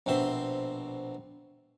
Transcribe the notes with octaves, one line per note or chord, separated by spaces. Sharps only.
A#1 B2 C4 E5 C6